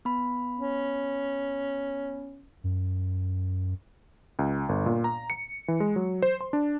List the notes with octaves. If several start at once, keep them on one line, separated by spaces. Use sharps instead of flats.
B3 B5
C#4
F#2
C#2
G1
A#2
A#5
C#7
E3
G#3
F#3
C5
C6
D4